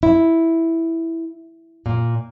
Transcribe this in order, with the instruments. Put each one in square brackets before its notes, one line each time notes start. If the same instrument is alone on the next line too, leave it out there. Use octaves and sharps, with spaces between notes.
[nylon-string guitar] E4
A#2